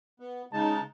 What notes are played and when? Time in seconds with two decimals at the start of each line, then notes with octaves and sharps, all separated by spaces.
0.20 B3
0.53 C#3 G#3 D#4 A5